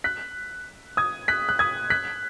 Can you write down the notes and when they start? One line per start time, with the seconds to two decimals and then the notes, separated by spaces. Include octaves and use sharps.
0.04 F#6 B6
0.97 D#6 G#6
1.28 F#6 B6
1.49 F#6
1.59 D#6 G#6
1.90 F#6 B6